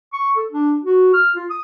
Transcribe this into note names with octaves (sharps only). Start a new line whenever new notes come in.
C#6
A4
D4
F#4
F6
F4
D#6